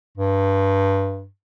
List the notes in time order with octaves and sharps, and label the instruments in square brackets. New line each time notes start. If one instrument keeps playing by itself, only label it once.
[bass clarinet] G2